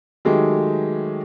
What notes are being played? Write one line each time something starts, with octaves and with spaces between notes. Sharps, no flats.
D#3 F#3 G#3 A3 G4